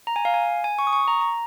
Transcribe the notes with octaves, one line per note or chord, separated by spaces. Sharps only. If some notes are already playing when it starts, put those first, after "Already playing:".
A#5
G#5
F5
G#5
G#5
C#6
D#6
C#6
A#5
A#5